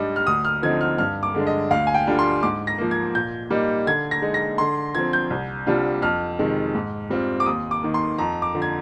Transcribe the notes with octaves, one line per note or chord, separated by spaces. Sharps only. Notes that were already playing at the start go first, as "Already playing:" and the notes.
Already playing: G#2 G3 D4 D#5
F6
D2 D#6
F6
D3 F3 C4 D#4 G#6
F6
G2 F6
D6
D3 G#3 D4
D#5
D2 F5
G#5
G5
D3 G3 D4 F4
C6
G#2 D6
A#6
F3 A#3
G#6
A#2 G6
G3 A#3 D#4
D3 G#6
A#6
G#3 D#4
A#6
D3 C6
F3 C4 G#6
G6
C2
C3 G3 D4 F4
F2 F6
C3 D#3 G#3
G#2
G3 C4 F4
D6
D#2 D#6
D6
D#3 A#3
C6
F2 A#5
D6
D3 F3
G#6